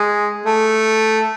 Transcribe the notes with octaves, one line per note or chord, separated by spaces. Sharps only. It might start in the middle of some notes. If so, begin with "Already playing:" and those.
Already playing: G#3
A3